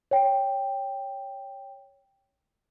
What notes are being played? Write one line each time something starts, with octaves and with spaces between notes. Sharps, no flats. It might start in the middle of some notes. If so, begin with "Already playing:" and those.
C#5 G5